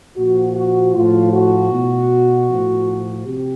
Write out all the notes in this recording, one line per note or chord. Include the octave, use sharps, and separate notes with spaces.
A#2 F3 F#4
F#4
A2 F3 F4
F#4
B2
A2 F3
C3 G4